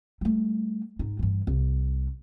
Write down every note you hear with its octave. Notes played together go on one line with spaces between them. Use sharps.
G3 A3
G#2 D#4
G2 E3
C2